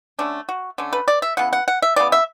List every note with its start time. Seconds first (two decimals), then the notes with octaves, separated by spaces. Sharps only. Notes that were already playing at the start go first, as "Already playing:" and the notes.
0.19 D3 A3 C#4 D4
0.49 F#4
0.78 D3 A3 C#4
0.93 B4
1.08 D5
1.22 E5
1.37 C#3 E3 B3 F#5
1.53 F#5
1.68 F#5
1.82 E5
1.96 C#3 E3 B3 D5
2.12 E5